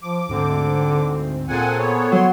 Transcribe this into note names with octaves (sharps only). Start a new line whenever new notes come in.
F3 D6
D2 G#2 D3 C4
A#2 C4 G#4 A4 F#5 G#5
B3 C#5
F#3 C6